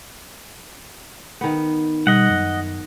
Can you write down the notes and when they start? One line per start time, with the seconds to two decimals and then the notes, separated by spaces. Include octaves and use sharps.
1.41 D#3 B3
2.07 B2 G3 D#5 F#5
2.30 F#2